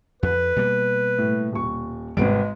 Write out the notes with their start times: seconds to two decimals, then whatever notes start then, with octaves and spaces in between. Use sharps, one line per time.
0.23 F2 B4
0.56 B2 G3 A#3
1.18 A2
1.52 D#1 C#6
2.17 G#1 G#2 C3 G3 G#3 B3 D7